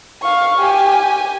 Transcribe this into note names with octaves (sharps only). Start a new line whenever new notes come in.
F5 C#6
G4 G#5